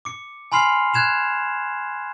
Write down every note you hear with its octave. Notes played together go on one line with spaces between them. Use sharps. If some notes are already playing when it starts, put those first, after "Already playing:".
D6 C#7
G#5 B5 C6 F6 C7 F7
F#6 G#6 E7 F7